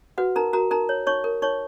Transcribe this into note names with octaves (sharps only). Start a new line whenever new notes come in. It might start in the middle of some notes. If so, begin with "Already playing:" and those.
F#4 B4 F#5
D#4 A#4 A#5
F#4 A#4 A#5
D#4 A#4 A#5
C#5
D#4 C#5 C#6
A#4
D#4 C#5 C#6